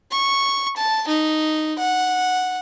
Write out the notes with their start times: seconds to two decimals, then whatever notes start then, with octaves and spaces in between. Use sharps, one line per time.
0.11 C#6
0.77 A5
1.08 D#4
1.78 F#5